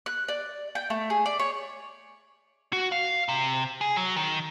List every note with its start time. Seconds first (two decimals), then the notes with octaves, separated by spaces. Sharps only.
0.06 F#6
0.28 D5
0.75 G5
0.90 A3
1.10 G#4
1.26 D5
1.39 C#5
2.73 F#4
2.92 F5
3.29 C3
3.81 G#4
3.97 F#3
4.16 D#3